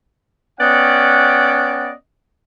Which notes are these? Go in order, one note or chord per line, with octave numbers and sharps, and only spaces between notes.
B3 C#4 D5 D#5 F#5 G5